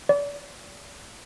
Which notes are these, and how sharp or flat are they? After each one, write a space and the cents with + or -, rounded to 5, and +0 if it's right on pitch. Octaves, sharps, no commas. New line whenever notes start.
D5 -35